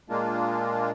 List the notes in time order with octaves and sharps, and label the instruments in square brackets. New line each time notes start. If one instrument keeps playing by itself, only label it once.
[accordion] A#2 G#3 A#3 D4 F4